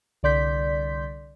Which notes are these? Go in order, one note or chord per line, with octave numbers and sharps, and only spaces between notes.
C2 D3 D5 C6 G6 B6